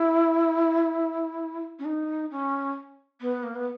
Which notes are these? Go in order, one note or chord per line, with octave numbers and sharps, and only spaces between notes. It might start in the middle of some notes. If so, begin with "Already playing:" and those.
Already playing: E4
C#4
D#4
C#4
B3
A#3
B3